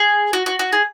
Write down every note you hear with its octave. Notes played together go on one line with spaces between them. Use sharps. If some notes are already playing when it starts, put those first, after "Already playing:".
Already playing: G#4
F#4
F#4
F#4
G#4